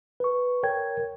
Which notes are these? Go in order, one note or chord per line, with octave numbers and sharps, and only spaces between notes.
B4 C#6
A#4 C#5 G5 G#6